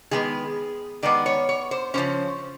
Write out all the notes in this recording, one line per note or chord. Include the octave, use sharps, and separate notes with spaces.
D#3 G#3 B3 G#4
D#3 G#3 B3 D5
C#5
C#5
C5
C#3 F3 A#3 C#4 C5